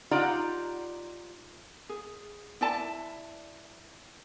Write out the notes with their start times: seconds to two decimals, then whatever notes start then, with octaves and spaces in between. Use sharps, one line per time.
0.11 D#4 F4 G4 D5 F#5 A#5
1.89 G#4
2.61 E4 D5 A5